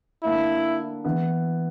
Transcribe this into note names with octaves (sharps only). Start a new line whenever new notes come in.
D3 A#3 D4 E4
E3 B3 E4